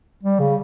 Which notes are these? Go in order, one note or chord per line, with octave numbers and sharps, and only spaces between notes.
G3
C#3